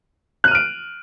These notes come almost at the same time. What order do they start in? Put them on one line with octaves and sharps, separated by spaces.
F#6 D#7 F6 D7